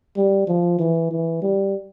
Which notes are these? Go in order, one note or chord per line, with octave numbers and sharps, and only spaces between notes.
G3
F3
E3
E3
G3